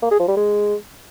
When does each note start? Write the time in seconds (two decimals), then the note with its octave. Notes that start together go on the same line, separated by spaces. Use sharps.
0.03 A#3
0.11 G#4
0.20 F3
0.28 G3
0.37 G#3